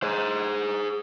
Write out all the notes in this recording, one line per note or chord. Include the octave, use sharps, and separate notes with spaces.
G#4 C5